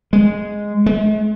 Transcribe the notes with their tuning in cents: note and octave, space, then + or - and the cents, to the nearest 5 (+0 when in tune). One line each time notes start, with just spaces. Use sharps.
G#3 -5
G#3 +45